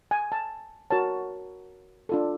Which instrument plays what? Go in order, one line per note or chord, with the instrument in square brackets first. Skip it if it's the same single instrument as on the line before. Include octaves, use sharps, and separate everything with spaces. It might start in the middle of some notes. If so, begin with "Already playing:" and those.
[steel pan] G#5
A5
F#4 A#4 C#5 A5
D4 F4 A4